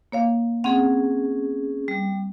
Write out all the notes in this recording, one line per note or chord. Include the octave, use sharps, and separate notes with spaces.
A#3 C#5 F5
C4 C#4 G#4 F#5
G3